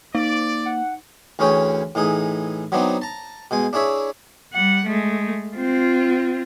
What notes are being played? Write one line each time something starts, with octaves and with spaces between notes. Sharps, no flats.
A#3 D#4 D5
F#5
D2 E3 C#4 G#4 C#5 G5
A2 E3 D#4 G#4
F#3 B3 C4 D4 D#4
A5 A#5
B2 G#3 G#5
D4 E4 G#4 C#5 E5
G3 F#5
G#3 A3
C4 F4